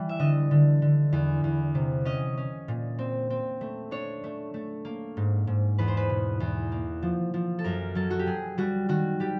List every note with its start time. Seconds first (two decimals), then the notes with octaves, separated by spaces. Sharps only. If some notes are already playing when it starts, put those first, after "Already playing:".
Already playing: E3 G3
0.09 E5
0.19 D3 D#5
0.51 D3
0.82 D3
1.12 E2
1.44 E2
1.75 C3
2.05 C#4 D#5
2.37 C#4
2.68 A#2
2.99 C4
3.30 C4
3.61 A3
3.91 D4 C#5
4.24 A3
4.54 A3
4.85 A#3
5.17 G#2
5.47 G#2
5.78 E2 B4
5.88 C5
5.97 B4
6.10 B2
6.40 E2
6.72 A#3
7.02 F3
7.34 F3
7.59 A4
7.64 F#2 A#4
7.95 F#3 A4
8.10 F#4
8.19 G4
8.26 F#3 G#4
8.58 G3 F#4
8.89 D#3 F#4
9.20 G3 G4